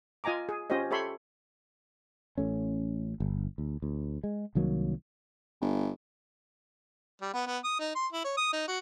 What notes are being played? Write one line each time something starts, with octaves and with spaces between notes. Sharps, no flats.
F4 D#5 G#5 A#5 D6
G#4
C#4 F4 G4 C5 D#5
G4 A4 C#5 E5 B5 C6
A1 A3 C#4
G1
D2
D2
G#3
C2 D#3 F#3 A#3
G1
G3
B3
B3
D#6
D#4
C6
E4
C#5
D#6
D#4
F#4